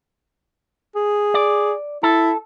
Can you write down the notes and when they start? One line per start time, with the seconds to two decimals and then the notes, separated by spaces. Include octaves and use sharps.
0.95 G#4
1.34 D5
2.03 E4 A4